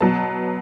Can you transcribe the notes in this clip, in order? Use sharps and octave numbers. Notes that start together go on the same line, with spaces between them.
B2 F#3 B3 A5